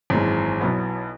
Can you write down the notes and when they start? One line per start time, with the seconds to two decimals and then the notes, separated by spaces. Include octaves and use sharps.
0.10 G#1 F#2 E3 G#3
0.60 B1 B2 F#3 B3 E4